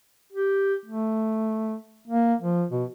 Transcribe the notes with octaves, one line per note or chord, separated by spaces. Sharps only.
G4
A3
A#3
F3
B2